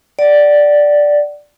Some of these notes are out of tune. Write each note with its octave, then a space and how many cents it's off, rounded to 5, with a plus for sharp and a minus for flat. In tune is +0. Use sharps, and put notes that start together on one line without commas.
D5 +0 F#5 +35